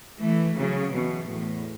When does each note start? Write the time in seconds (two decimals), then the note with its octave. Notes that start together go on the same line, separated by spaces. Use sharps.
0.21 E3 A3
0.57 C#3 F#3
0.93 B2 E3
1.28 E2 A2